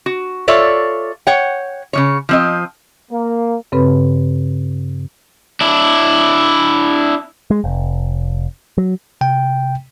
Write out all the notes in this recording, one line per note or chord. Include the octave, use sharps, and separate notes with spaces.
F#4
F4 A4 C#5 D5 E5
C#5 F#5 G5
C#3 F3 C#5
F3 C4 D#5
A#3
G2 C#3 C4 A4 B4 B5
D4 E4
G#3
F1
F#3
C3 G5